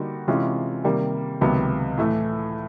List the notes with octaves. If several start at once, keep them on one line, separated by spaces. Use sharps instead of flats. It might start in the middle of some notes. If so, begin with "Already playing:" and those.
Already playing: D3 G3 A#3 D#4 F#4
C3 E3 G#3 C#4 F4
C3 D#3 G3 A#3
C#2 C3 D#3 F#3 B3
A2 E3 A3